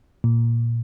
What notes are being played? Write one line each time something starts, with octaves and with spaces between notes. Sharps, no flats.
A#2